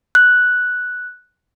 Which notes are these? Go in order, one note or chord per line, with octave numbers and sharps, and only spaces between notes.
F#6